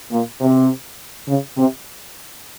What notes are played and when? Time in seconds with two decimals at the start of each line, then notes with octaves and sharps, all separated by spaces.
0.11 A#2
0.41 C3
1.27 C#3
1.56 C3